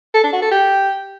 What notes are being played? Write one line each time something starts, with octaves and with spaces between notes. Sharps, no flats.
A4
D4
F#4
A4
G4